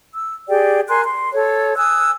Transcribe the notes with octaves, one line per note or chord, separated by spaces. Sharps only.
E6
G4 G#4 D5 G5
A#4 G#5 C6 F#6
C6
A4 C#5
G#5 D#6 E6 F#6